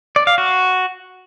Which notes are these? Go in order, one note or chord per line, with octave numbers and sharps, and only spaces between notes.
D5
F5
F#4